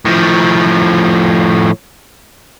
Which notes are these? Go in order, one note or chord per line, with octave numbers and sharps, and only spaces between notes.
A2 F3